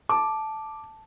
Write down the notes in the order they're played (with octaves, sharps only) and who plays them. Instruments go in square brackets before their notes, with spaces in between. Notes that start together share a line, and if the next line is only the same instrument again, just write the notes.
[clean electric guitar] A5 [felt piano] D6